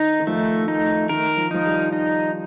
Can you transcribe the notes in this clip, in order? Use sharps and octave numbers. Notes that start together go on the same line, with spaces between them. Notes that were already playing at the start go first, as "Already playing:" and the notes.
Already playing: D#3 D#4
D#3
F3 A3
D#4
D#3 A#4
F3
F3 D#4
G3
D#4